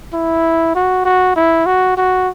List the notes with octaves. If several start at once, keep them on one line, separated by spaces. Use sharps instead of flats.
E4
F#4
F#4
E4
F#4
F#4